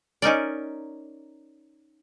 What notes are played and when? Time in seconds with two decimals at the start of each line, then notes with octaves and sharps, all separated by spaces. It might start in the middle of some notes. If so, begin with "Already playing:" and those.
0.22 C#4 D#4 A#4 D5